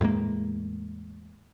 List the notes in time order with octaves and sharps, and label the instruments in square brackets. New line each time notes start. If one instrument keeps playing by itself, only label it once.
[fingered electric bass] E2 A2 G#3 A#3